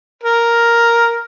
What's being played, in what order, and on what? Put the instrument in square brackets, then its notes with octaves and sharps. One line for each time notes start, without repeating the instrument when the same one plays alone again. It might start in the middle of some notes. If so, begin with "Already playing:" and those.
[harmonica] A#4